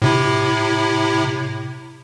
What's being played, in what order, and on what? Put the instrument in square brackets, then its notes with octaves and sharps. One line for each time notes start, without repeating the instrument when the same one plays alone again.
[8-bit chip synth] A2 C3 E4